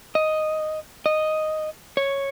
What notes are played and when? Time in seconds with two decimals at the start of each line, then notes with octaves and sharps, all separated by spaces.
0.15 D#5
1.06 D#5
1.97 C#5